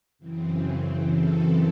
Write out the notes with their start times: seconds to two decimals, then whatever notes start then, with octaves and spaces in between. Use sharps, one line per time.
0.19 F#2 C#3 E3 C4
1.06 A4